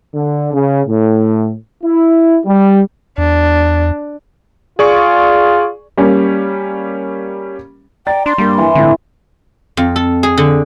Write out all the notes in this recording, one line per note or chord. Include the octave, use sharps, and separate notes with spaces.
D3
C#3
A2
E4
G3
E2 D4
F4 G#4 D5 C#6
G3 A#3 C#4
D5 G5 A#5 A6
D4 C6
G2 G3 A#3
E3
F2 A2 D3
F2
A4
G#4
D3